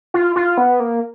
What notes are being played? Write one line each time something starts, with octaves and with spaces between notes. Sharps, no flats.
F4
F4
B3
A#3